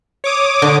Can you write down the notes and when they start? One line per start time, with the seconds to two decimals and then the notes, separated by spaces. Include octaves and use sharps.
0.24 C#5 D6 D#6
0.62 D3